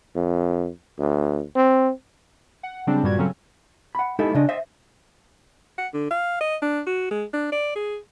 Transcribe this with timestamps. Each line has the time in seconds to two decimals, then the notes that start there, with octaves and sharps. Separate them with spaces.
0.16 F2
0.99 D2
1.56 C4
2.63 F#5
2.87 C#3 F#3 G3 C4 D4
3.03 G2 A#2 G3 F#4 G#6
3.18 C#3 F#3 C4 C#4 A4
3.95 F#5 B5
4.19 G#3 B3 D#4 E4 G4 A4
4.34 C#3 D4 D#5
4.49 C5 D#5 E5
5.78 F#5
5.93 D3
6.10 F5
6.40 D#5
6.62 D4
6.86 F#4
7.10 G#3
7.33 D4
7.51 D5
7.75 G#4